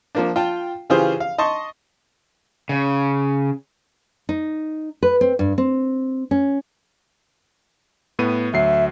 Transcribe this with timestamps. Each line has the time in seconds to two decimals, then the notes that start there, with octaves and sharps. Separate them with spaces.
0.15 F3 A#3 D4
0.36 F4 G5 A5
0.90 C#3 E3 F4 G4 G#4 C5
1.20 F5
1.38 D#5 A5 C6 C#6
2.69 C#3
4.29 D#4
5.03 B4
5.21 C4
5.39 G2
5.58 C4
6.31 C#4
8.19 A2 B3 D#7
8.53 D2 F#3 E5 C7